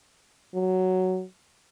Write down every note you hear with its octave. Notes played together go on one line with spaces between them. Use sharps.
F#3